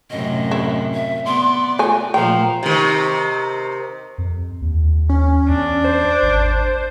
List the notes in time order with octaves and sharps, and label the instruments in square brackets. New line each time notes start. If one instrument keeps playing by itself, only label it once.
[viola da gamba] F#2 A2 C3 [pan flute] D#5
[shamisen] E4
[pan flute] E5
[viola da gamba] B3 D5 [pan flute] C6
[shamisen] A3 G#5 [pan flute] F4
[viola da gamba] A#2 F3 A3 [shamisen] G5 [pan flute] A#5
[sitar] C3 D#3
[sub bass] F2
D#2
[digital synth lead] C#4
[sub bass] E2 [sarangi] D4
[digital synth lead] C5
[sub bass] G#1